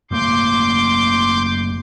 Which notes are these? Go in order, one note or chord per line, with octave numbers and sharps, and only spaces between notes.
F#1 A3 A#3 C6 D6 G6